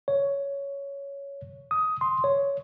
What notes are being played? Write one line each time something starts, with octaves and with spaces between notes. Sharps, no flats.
C#5
D#6
C6
C#5